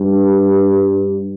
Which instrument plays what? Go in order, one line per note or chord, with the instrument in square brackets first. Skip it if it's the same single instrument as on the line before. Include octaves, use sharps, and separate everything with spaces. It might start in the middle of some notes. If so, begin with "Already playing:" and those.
Already playing: [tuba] G2